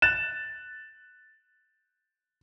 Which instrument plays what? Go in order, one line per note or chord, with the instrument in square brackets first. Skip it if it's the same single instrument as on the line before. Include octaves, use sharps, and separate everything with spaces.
[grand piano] F#6 A6 E7